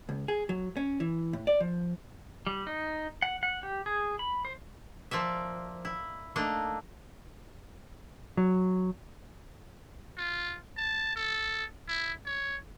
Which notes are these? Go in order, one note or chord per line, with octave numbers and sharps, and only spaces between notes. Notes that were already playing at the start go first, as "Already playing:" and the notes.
C#2
G#4
F#3
C#4
E3
A2
D5
F3
G3
D#4
F#5
F#5
G4
G#4
B5
C5
F3 A#3 D5 E5
E4
A3 A#3 D4 D#4
F#3
F4
A5
A4
E4
C#5